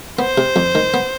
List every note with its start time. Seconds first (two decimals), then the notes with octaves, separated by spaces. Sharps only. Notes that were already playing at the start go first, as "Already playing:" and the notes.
0.19 B3 C5
0.38 C3
0.56 F2
0.75 D#3
0.94 B3